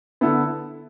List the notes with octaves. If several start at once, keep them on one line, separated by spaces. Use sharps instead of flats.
D3 B3 E4 A4